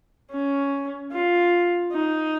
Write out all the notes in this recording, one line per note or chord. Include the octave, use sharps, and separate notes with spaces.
C#4
F4
D#4